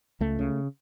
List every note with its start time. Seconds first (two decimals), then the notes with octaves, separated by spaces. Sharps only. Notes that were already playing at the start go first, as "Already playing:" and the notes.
0.20 C#2 A3
0.39 C#3